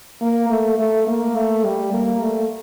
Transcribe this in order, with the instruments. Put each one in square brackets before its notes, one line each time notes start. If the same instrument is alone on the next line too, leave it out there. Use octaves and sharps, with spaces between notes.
[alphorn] A#3
A3
A3
A#3
A3
G3
A#3
A3